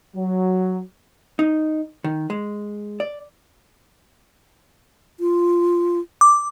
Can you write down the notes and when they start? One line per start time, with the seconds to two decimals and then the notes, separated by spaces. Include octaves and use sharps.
0.16 F#3
1.39 D#4
2.04 D#3
2.30 G#3
3.00 D5
5.20 F4
6.21 D6